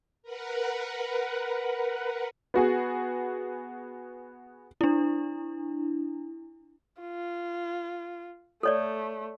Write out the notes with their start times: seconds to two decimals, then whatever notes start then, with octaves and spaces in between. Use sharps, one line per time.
0.23 A#4 B4 F#5
2.54 B3 F#4 G#4
4.81 D4 E4
7.01 F4
8.63 A3 A4 C#5 D5